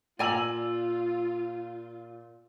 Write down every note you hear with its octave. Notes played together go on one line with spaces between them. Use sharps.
A#2 F4 D5 G#5 A#5 E6 F#7